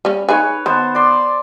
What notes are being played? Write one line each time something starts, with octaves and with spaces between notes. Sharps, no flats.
G3 C#4
D#4 G#4 B4 C#5 G#5
D#3 B3 C5 A5
D5 C6